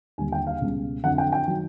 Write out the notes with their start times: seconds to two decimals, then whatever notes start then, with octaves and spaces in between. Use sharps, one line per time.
0.18 D#2 D3 G3 G#5
0.32 G5
0.47 F5
0.61 C#2 B2 G3
1.03 F2 D3 F#3 F#5
1.18 G5
1.33 G5
1.48 D#3 F#3